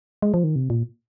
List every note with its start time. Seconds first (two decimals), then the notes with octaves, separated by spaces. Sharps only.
0.22 G#3
0.34 F3
0.44 D#3
0.56 C3
0.70 A#2